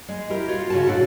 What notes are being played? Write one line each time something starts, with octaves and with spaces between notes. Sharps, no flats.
G#3
E4 G4 A#4
F4 F#4 C#5
C#3 F#4 A5
A2 D3 F#4 A4 D5